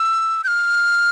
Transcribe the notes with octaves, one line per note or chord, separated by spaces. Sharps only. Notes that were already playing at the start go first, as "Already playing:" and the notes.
Already playing: E6
G6
F6